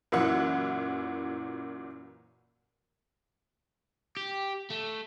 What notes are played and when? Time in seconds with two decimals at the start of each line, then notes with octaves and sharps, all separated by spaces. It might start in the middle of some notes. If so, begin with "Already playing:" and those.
0.12 F#2 A#2 E3 F#5
4.17 G4
4.71 A3